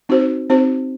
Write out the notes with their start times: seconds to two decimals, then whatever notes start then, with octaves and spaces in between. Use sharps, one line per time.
0.09 C4 D#4 F#4 C5
0.50 C4 D#4 F#4 C5